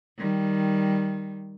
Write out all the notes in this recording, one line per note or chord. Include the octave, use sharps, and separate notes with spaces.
D#3 G3